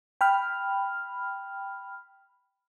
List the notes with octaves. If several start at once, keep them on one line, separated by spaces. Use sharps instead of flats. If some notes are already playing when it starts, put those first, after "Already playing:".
G5 B5 F6